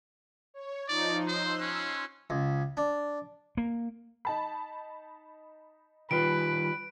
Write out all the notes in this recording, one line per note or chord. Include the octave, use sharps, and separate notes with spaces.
C#5
F3 D#4 D5
C5 C6 E6 F#6
C#4
C#2
D4
A#3
D#4 A5 B5
D#3 G3 F4 B4 D7